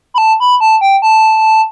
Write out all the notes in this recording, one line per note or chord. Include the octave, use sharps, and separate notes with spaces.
B5
A5
B5
A5
G5
A5